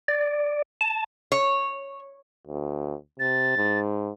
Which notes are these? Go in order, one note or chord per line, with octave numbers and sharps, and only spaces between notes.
D5
A5
C#5
D2
C3 A6
G#2